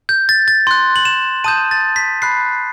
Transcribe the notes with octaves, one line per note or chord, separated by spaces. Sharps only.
G6
A6
A6
C6 F#6
F#7
E7
A5 D#6 G6 D#7
A6
B6
B5 F#6 C7